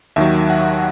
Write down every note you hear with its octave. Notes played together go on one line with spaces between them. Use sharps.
D#2 D#3 F#3 E5
F#5